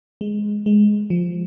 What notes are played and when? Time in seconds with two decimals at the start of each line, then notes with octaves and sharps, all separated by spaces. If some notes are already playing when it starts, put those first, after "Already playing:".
0.21 G#3
0.66 G#3
1.10 F3